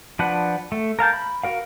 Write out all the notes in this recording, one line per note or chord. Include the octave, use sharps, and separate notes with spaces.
F3 D4 B4 F#5
A3
A#4 F5 A5 G6
B5
F#4 A#4 F5